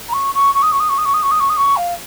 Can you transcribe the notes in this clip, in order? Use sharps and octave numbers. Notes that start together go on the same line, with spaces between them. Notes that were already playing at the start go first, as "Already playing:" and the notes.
A#5
C#6
C#6
C#6
D#6
C#6
D#6
C#6
D#6
C#6
D#6
C#6
D#6
C#6
D#6
C#6
F5